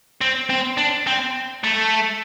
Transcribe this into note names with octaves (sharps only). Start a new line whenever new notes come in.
C4
C4
D4
C4
A3